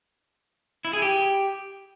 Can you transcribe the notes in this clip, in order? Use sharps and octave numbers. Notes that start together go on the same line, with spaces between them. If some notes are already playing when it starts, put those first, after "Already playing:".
E4
G#4
G4